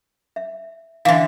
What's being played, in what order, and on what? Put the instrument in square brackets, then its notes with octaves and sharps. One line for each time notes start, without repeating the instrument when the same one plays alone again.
[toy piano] E5
[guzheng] D3 E3 [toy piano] F5 D#6